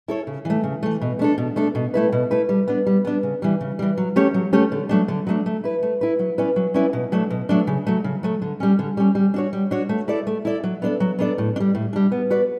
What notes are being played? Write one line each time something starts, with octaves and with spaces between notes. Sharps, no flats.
E4 A4 C#5
C#3
E3 A3
C#3
E3 A3
B2
A3 D4 A4
B2
A3 D4 A4
B2
A3 E4 B4
B2
A3 E4 B4
G3
B3 D4
G3
B3 D4
C#3
E3 G3
C#3
E3 G3
F#3
A3 C#4 G4 C#5
F#3
A3 C#4 G4 C#5
D3
F#3 A3 D4
D3
F#3 A3 D4
A3
E4 B4
A3
E4 B4
F#3
C#4 E4 B4 D5
F#3
C#4 E4 B4 D5
B2
F#3 A3 D4
B2
F#3 A3 D4
C#3
F#3 A3
C#3
F#3 A3
D3
G3 C#4
D3
G3 C#4
G3
D4 F#4 C#5
G3
D4 F#4 C#5
A3
E4 A4 D5
A3
E4 A4 D5
F#3
B3 D4 A4 D5
F#3
B3 D4 A4 D5
A2
D4
G3
A2
G3 D4
B3
F#4 B4 D5